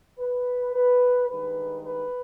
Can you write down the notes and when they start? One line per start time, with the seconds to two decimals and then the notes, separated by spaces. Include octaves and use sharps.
0.19 B4
0.74 B4
1.29 G2 D#3 G#3 B4
1.85 B4